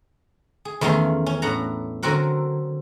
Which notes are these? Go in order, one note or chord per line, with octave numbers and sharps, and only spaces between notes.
G#4
E2 D#3 A3 C#4 F5 C6
C#4
A2 D4 F#5 A#5
D3 F#3 C4 F#4 A#4 F#5